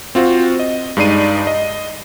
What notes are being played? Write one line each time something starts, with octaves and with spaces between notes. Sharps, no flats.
C4 F4 F#4 C5
D#5
G2 G#3 D#4 D5 C7 D#7
D#5